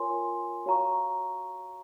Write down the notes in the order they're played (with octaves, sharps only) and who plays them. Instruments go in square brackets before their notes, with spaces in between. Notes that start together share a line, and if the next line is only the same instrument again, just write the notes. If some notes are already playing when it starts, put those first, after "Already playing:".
Already playing: [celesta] F4 A#4 C#5 G#5 C6
F#4 C#5 F5 A#5 C#6